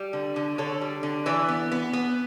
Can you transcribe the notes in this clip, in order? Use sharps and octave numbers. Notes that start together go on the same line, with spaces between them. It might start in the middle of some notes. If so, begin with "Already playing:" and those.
Already playing: G3
D3
D3
D3 A4 C#5
G3
D3
E3 B4 D5
B3
B3
B3